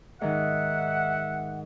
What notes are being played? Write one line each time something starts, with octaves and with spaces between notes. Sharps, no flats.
G#2 D#3 E5 F#5